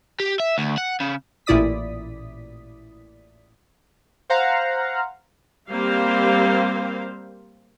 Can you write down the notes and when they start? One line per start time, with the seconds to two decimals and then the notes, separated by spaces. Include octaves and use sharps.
0.20 G4
0.40 E5
0.58 D2
0.77 F#5
1.00 C#3
1.46 A1 A#2 E4 D5 D#6 B6
4.30 C5 F5 F#5 A#5
5.69 G3 A#3 C4 G4 C5 F5